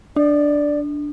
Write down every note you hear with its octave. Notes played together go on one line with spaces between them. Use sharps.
D4 D5